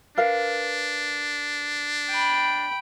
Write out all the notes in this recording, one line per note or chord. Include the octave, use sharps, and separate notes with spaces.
D4 A#4 B4 F5
G5 B5